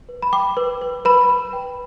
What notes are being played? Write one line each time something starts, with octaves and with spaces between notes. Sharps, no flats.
B4
B5
G5 D6
B4
B4
B4 B5
B4
G5